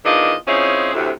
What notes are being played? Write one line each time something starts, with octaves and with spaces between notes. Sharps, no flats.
E2 D#3 D4 F4 D#5
F3 C4 C#4 D#4 E4 G#4
D2 A2 C3